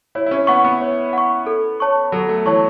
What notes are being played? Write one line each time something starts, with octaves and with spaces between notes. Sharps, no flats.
E4 C#5
E4
C#4
B3 F#5 C#6
B3
C#5
F#5 C#6
A4
C#5 A5 C#6
F#3 A4
A3
E3 C#5 A5 C#6